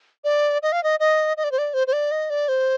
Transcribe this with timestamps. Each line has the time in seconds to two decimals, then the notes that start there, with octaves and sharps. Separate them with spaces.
0.24 D5
0.63 D#5
0.72 F5
0.84 D#5
1.00 D#5
1.37 D#5
1.44 D5
1.52 C5
1.58 D5
1.74 C5
1.87 C5
1.93 D5
2.11 D#5
2.30 D5
2.48 C5